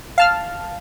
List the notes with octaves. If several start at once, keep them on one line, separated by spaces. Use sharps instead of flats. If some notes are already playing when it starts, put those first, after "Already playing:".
F5 A5 F6